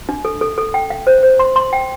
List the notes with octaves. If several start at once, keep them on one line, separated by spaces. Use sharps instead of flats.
D4
A4
A4
A4
G5
F5
C5
C5
C6
C6
G5